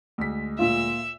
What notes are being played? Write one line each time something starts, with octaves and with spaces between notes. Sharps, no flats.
D2 G#3 B6
A#2 F4 E5